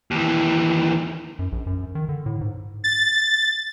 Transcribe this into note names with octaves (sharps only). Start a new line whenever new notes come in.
D#2 E3
F#2
A#1
F#2
D#3
D3
A2
G#2
A6